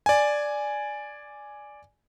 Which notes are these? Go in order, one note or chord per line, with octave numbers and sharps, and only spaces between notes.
D5 G#5